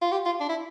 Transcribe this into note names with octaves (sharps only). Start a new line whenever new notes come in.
F4
G4
F4
D4
E4